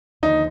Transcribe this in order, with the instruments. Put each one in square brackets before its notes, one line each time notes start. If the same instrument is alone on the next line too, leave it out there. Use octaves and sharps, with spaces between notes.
[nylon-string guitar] D#2 D3 F3 A#3 [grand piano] D#4